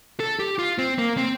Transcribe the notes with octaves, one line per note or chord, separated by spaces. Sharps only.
A4
G4
F4
C4
A#3
C4